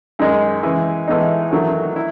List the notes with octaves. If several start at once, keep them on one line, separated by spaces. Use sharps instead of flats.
F#2 D#3 G#3 D#4
C#3 E3 G#3
A2 E3 G#3 B3 D#4
E2 D#3 F#3 A3
E4